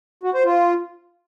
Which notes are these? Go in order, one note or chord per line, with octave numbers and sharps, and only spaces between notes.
F#4
C5
F4